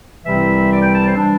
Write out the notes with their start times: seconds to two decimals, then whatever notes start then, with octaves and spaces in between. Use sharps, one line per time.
0.24 C2 C3 E3 G3 C4 E5
0.71 D5
0.82 G5
0.93 A5
1.06 C5
1.16 E3 G3 D4